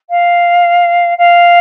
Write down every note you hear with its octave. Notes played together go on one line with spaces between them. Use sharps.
F5
F5